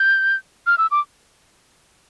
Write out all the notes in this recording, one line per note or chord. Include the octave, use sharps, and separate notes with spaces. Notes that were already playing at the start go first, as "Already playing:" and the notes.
Already playing: G6
F6
E6
D6